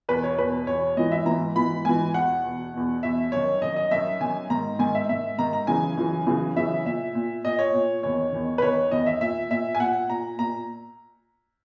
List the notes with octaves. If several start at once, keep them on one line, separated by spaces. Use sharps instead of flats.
E2 B2 B4
C#5
E2 B2 B4
E2 B2 C#5
G#2 E3 D#5
E5
G#2 E3 A#5
G#2 E3 B5
G#2 E3 G#5
E2 B2 F#5
E2 B2
E2 B2
E2 B2 E5
F#2 D#3 C#5
F#2 D#3 D#5
D#5
F#2 D#3 E5
F#2 D#3 G#5
G#2 D#3 A#5
G#2 D#3 G#5
E5
G#2 D#3 E5
G#2 D#3 A#5
A#5
F#2 C#3 E3 G#5
F#2 C#3 E3
F#2 C#3 E3
F#2 C#3 E3 E5
A#2 E5
A#2
A#2 D#5
C#5
A#2
E2 D#3 C#5
E2 D#3
B4
E2 D#3 C#5
E2 D#3 D#5
E5
A#2 E5
A#2 E5
G#5
A#2 F#5
A#2 A#5
A#2 A#5